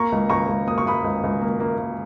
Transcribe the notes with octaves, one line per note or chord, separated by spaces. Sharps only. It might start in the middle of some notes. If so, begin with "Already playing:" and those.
Already playing: A#3 A#5 C#6
C#2
C#2 A#5 C#6
C#2
A#3 D#6
C#6
A#3 B5 D#6
C#2
C#2
A#3
A#3
A#3